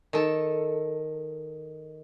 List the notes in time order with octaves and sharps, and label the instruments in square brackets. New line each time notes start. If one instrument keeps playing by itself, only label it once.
[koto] D#3 A4